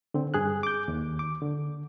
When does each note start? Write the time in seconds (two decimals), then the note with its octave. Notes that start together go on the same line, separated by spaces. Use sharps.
0.14 D3 C4
0.34 G2 G#4 F#6
0.63 D6 G6
0.88 D#2
1.19 D6
1.42 D3